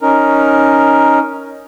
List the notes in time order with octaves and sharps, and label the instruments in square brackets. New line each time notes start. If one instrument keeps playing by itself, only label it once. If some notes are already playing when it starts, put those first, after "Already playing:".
[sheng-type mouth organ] C#4 D#4 A#4